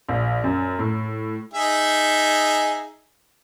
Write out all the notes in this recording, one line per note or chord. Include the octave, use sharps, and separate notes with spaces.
A#1
F#2
A2
D#4 G#4 E5